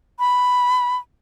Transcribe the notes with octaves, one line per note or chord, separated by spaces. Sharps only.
B5